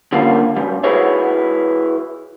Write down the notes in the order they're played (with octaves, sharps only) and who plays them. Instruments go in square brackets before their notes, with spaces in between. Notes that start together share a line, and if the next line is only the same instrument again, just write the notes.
[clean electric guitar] D3 G3 A#3 C#4 F4
B1 F#2 G3
E4 F#4 G#4 B4 C#5 E5